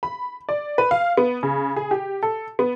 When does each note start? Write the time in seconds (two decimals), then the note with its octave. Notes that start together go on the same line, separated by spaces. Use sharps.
0.03 B5
0.49 D5
0.78 B4
0.91 F5
1.17 B3
1.43 C#3
1.76 G#4
1.91 G4
2.23 A4
2.59 B3